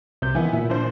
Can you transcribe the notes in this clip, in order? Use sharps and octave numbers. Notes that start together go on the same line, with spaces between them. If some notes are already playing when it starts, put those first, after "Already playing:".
C2 C3 G6
D#3 E3 B3 E4 G#5
A#2 E4
A#1 D4 C5